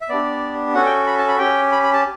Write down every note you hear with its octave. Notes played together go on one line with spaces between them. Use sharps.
E5
B3 D4 G4 D5
C#4 F#4 A4 F#5
G5
B5
A5
B5
C#4 G4 G5
B5
B5
A5